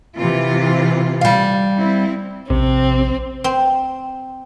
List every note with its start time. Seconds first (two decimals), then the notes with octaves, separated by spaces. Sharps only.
0.19 C3 E3 F4
1.21 G3 F5
1.77 C4 E4
2.50 A#1 C3 C4
3.44 C4